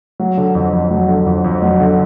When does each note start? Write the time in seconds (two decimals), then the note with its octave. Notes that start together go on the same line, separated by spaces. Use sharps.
0.20 F#3
0.37 D3
0.55 F2
0.73 F2
0.91 F#3
1.08 D3
1.26 F2
1.44 F2
1.62 F#3
1.80 D3